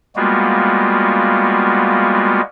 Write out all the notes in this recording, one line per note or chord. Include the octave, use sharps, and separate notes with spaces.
G3 G#3 A#3 B3 F4 F#4